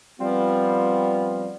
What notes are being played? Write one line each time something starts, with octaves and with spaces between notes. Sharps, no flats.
F3 G3 B3 C4 F4